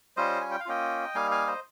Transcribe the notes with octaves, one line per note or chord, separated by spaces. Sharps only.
G3 C#4 F4 C5 D#5
G#5
G5
F5
A#3 C#4 F4 D#5 G5
G3 A#3 D#4 F5 G#5
F5 G#5
C5 D#5